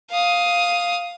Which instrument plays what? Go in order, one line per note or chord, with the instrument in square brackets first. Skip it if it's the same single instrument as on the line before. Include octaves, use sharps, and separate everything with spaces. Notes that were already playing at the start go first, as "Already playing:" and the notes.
[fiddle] F5 D#6